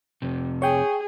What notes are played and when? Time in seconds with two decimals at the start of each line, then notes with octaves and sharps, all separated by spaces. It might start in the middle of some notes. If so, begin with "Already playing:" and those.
0.22 F2 C3
0.62 G#4 C#5 G5